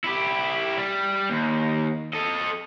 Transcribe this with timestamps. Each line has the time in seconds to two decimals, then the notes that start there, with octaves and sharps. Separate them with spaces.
0.04 E4 G4
0.77 G3
1.30 D#2
2.13 A4 D#5